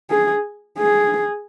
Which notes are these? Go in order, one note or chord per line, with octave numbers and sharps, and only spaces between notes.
G#4
G#4